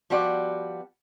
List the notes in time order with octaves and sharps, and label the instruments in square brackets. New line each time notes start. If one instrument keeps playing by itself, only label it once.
[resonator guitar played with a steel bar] F3 G3 B3 F#4 D5